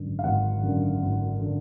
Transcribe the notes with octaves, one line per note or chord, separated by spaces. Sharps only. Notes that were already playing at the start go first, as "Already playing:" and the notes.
Already playing: G#1 F#2 D3
F5
G#1 F#5
F#2 D3
G#1
D3